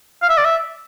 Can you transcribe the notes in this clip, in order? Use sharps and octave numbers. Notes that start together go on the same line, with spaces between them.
F5
E5
D5
E5